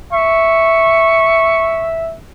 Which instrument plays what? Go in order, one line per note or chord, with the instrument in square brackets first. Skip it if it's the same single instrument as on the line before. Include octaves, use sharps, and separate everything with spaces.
[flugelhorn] E5 [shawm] C#6